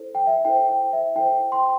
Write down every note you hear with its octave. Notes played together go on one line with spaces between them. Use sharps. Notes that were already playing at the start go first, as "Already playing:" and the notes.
Already playing: E4 A4 C5
G5
E5
E4 A4 C5 G5
G5
E5
E4 A4 C5 G5
G5 C6